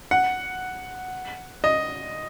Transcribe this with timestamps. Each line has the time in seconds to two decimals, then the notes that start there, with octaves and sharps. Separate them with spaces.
0.11 F#5
1.64 D#5